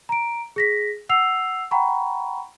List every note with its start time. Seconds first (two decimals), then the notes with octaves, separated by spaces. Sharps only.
0.09 A#5 D7
0.56 G#4 A#6 B6
1.09 F#5 E6 C7 F7
1.71 F#5 G5 A#5 B5 C#6